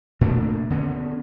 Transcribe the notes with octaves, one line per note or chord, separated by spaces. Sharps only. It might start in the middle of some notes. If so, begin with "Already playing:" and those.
A#2 A3 A#3 D4
D3 B3 C#4